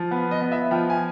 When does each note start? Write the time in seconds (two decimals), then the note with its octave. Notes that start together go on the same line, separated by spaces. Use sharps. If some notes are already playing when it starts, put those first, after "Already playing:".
Already playing: F3
0.11 B3
0.31 D#5
0.41 B3
0.52 E5
0.71 F3 G5
0.90 G#5